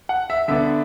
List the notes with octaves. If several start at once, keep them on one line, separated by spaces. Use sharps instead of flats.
F#5
E5
D3 B3 D4 E5